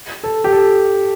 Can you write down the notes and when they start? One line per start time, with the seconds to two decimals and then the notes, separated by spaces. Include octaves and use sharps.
0.23 A4
0.44 G4
0.52 A4